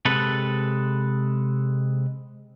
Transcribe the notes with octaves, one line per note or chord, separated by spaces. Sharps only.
C3 G#3 A4 B4